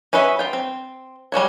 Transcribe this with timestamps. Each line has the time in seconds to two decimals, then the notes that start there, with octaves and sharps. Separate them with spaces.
0.13 C#4 F#4 B4 D#5 E5
0.39 F4 G5
0.53 C4
1.32 G3 G#3 F#4 C#5